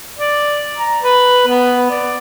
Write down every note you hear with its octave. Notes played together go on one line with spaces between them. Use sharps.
D5
A#5
B4
B3
D5